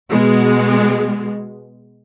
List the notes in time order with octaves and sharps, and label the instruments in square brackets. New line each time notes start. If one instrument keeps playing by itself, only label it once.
[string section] B2 G#3